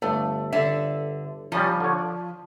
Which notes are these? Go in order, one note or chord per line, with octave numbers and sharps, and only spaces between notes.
G1 A3
D3 E5
F3 G3 C#4 D#4
D3 C#5
D5